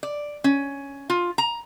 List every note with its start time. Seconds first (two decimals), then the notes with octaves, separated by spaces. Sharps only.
0.03 D5
0.44 C#4
1.10 F4
1.38 A#5